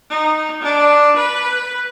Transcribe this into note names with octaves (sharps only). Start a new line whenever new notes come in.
D#4
D4
B4